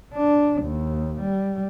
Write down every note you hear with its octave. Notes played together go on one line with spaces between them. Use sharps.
D4
D#2
G3